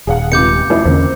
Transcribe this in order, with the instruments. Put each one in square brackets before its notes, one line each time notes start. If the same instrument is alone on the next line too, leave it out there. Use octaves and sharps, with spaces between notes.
[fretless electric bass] D#1 [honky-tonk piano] G#4 F5 F#5
[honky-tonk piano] C#2 C3 [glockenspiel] D6 G6 C#7
[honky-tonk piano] A1 F2 E4
[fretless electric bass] E2 D3 C#4 [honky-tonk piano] A#3 C4